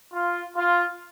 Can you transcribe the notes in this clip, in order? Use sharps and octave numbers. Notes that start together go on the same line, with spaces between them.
F4
F4